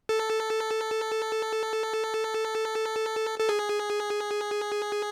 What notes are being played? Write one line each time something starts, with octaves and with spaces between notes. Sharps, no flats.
A4
A4
G#4